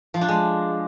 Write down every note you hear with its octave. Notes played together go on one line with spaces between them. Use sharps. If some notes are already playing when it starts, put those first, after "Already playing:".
F3
D4
G#3